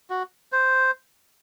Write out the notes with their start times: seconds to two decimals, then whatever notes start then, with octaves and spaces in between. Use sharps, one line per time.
0.10 F#4
0.52 C5